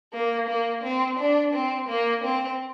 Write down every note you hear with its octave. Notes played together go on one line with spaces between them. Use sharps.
A#3
A#3
C4
D4
C4
A#3
C4